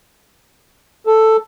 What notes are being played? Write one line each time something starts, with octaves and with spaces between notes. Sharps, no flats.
A4